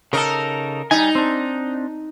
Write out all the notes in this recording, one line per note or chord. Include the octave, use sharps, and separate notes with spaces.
C#3 D#4 A4 A#4
G3 D#4 G#5
C4 D4